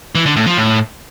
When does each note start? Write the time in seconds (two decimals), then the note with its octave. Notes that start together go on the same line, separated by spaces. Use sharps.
0.15 E3
0.26 D3
0.36 A2
0.47 F3
0.57 A2